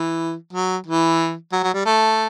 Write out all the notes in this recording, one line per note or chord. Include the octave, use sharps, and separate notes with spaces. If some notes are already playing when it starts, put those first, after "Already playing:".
Already playing: E3
F#3
E3
F#3
F#3
G3
A3